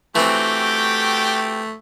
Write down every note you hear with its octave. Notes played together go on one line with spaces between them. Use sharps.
E3 A3 C4 F#4 G4 G5